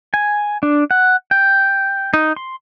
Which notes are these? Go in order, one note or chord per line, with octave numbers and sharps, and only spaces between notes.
G#5
D4
F#5
G5
D#4
C6